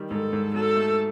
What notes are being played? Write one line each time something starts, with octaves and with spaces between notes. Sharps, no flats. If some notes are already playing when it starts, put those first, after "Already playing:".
Already playing: D#3 G3
G#2 A4
G#2
F#3 A4
A3